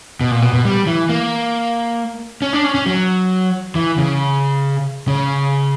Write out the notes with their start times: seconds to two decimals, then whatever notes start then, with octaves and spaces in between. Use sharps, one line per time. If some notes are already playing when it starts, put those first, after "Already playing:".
0.21 B2
0.31 A#2
0.42 B2
0.53 B2
0.65 G3
0.87 E3
1.09 A#3
2.42 C#4
2.53 D4
2.64 C#4
2.75 C#4
2.86 F#3
3.75 E3
3.98 C#3
5.08 C#3